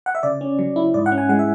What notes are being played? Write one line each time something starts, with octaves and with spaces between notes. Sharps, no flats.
F#5
E5
C#3 D5
C#4
F#3
E4
G#2 D5
F#5
C#4
G#5
G#3 F#5
E5